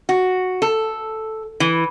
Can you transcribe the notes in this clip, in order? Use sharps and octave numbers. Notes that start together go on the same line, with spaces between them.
F#4
A4
E3